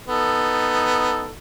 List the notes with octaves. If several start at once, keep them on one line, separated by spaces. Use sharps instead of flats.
B3 D#4 A4